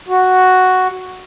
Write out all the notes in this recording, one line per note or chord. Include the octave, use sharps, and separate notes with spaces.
F#4